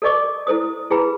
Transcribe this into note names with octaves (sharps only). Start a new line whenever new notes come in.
A4 A#4 D5 D#5 C#6 D6
E4 A4 C5 D#6
E4 G#4 B4 G5 A#5 B5